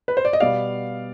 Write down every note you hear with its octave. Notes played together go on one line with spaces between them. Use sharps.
B4
C5
D5
D#5
B2 G3 B3 D5 F5